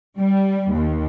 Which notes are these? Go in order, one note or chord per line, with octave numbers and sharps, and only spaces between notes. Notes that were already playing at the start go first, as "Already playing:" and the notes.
G3
D#2